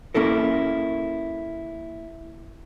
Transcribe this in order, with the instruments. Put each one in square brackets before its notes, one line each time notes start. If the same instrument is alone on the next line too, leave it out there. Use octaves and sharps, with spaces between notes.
[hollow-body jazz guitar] A#3 C#4 E4 A4 A#4